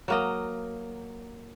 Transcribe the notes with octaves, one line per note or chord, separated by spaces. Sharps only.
F#3 A#3 D#5